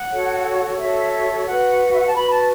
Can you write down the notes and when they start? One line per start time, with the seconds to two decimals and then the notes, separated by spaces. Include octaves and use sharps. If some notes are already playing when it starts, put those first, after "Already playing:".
Already playing: F#5
0.11 F#4 A4 C#5
0.78 F#4 A4 C#5 E5
1.12 E5
1.46 F#4 B4 F#5
1.93 E5
2.00 F#5
2.07 A5
2.14 F#4 B4 B5
2.31 A5